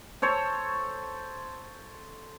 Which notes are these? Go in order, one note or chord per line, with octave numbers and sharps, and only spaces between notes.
A4 C5 C#5